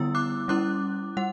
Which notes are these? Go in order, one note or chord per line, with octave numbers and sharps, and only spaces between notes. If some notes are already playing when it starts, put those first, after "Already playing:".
Already playing: D3 G3 B3 E4 E6
D6 F#6
G3 C#4 E4 D6 F#6
G3 F#5